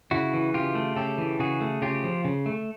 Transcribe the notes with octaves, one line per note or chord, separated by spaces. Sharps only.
C#3 E4 F#4
E3
C#3 F4 G4
A3
C#3 G4 A4
E3
C#3 F#4 G#4
A3
C#3 F4 G4
F3
C#3
A3